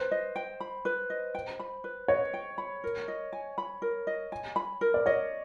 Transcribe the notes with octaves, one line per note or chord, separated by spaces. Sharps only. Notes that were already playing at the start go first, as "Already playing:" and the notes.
Already playing: B4 C5
D#5
G5
B5
B4
D#5
G5
B5
B4
C#5 D#5
G5
B5
A#4
D#5
G#5
B5
A#4
D#5
G#5
B5
A#4
D5
C#5 D#5